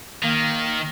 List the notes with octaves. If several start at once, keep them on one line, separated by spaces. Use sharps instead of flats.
D#3 A#3